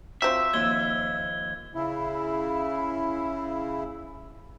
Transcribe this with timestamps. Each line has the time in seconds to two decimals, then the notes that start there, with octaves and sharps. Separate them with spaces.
0.22 F#3 C4 F4 E5
0.53 D#2 F3 G#6 G7
1.75 C#3 E4